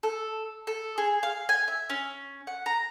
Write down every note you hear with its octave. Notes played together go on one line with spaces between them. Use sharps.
A4
A4
G#4
F5
G#5
E5
C#4
F#5
A#5